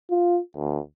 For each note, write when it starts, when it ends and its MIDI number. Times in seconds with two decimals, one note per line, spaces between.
0.10 0.39 65
0.56 0.79 38